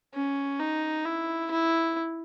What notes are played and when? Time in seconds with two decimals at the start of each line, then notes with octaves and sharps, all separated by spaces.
0.14 C#4
0.59 D#4
1.05 E4
1.51 E4